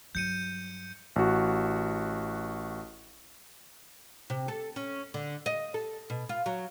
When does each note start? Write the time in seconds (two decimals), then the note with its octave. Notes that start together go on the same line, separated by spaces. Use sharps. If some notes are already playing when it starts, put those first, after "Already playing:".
0.15 G2 F#3 G6 C#7 D#7
1.16 A1 F#4
4.30 C3
4.48 A4
4.76 C#4
5.14 D3
5.46 D#5
5.74 A4
6.10 B2
6.29 F4
6.46 F#3